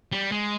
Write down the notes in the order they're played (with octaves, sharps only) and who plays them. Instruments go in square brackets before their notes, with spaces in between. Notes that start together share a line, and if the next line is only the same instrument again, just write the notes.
[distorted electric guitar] G3
G#3